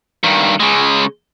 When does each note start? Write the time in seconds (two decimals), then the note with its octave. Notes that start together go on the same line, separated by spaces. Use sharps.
0.23 G2 D#3
0.60 C#3 G#3